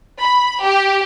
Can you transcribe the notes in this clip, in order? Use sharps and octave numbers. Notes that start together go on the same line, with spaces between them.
B5
G4